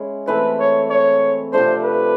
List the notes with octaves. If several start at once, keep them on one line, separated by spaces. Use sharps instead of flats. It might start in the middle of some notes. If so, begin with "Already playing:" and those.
Already playing: G#3 C#4 E4
E3 A3 C4 E4 B4
C#5
C#5
C3 F3 A3 D4 C5
B4